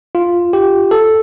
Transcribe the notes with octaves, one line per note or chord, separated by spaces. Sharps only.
F4
G4
A4